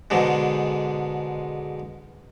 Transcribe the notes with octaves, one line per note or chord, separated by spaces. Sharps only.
G#2 B2 D3 G#3